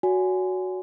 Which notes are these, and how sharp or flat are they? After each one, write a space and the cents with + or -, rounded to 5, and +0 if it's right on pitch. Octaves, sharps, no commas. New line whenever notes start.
F#4 +0 C#5 +45 G#5 +0